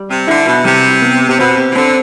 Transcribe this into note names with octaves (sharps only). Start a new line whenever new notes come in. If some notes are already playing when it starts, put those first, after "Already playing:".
Already playing: G3
C3
D3 E4
B2
C3 G3
B3
C3
B2 C4
C3
E3
D3 C4